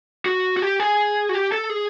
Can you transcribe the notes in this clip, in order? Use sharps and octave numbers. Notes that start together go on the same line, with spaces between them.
F#4
F#4
G4
G#4
F#4
G4
A4
G#4